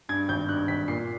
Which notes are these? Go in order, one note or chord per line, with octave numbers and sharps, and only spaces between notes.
G2 G#6
G#1 G6
G2 F#6
G#1 B6
A#2 C7